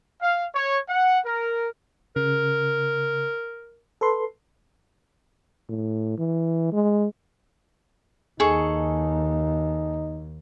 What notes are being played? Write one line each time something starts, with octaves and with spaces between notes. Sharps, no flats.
F5
C#5
F#5
A#4
C#3 A#4
A4 B4 C6
A2
E3
G#3
D#2 D#4 G#4 A4 C#6